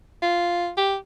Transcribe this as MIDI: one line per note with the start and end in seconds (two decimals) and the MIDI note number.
0.22 0.70 65
0.77 0.95 67